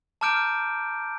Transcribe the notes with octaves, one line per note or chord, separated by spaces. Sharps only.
A5 A#5 D6 F6 G6 D7